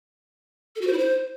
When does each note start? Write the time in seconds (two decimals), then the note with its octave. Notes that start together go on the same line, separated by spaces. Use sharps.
0.76 A4
0.81 F#4
0.87 C5
0.93 E4
0.98 C5